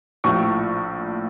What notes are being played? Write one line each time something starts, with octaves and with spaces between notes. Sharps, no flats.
A#1 A2 F3 A3 C#6